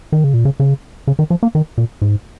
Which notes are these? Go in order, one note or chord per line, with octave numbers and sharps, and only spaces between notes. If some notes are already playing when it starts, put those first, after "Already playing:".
D#3
C#3
A#2
C#3
C#3
C#3
D#3
F3
A#3
D#3
A#2
G#2